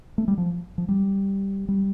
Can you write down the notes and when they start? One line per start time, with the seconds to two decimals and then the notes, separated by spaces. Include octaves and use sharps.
0.18 A3
0.28 G3
0.38 F3
0.78 F3
0.89 G3
1.69 G3